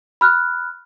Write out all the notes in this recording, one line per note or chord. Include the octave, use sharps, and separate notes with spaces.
B5 F6 F#6